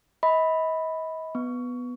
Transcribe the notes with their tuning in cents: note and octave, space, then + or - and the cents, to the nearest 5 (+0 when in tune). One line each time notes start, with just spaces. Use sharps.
D#5 +40 B5 +0
B3 +0 C#6 +20